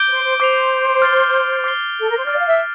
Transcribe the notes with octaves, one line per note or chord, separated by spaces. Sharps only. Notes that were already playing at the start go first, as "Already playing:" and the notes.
Already playing: D6 G6 D7 G7
C5
C5
C5 D6 G6 C7 F7
F6 A6 C7 G7
D6 F6 C7 G7
A4
A#4
C5
D5 D6 F6 A6
F5
E5